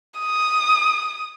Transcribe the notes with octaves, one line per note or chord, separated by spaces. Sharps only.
D#6